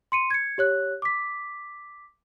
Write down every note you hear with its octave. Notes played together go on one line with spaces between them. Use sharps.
C6 C#7 D#7
G#6 C#7
G4 C#5 F#6
D6 B6